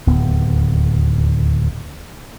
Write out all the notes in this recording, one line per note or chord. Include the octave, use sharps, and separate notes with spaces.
D1 D#2 B3